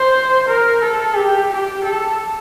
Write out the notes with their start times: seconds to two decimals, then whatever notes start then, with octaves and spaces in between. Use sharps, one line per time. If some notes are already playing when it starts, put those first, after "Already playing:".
Already playing: C5
0.48 A#4
0.82 A4
1.15 G4
1.49 G4
1.84 A4